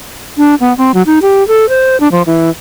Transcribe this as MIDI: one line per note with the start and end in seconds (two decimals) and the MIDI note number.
0.38 0.55 62
0.60 0.76 59
0.78 0.92 60
0.94 1.02 54
1.06 1.19 63
1.22 1.46 67
1.48 1.68 69
1.69 1.99 72
2.00 2.10 62
2.12 2.22 53
2.27 2.50 52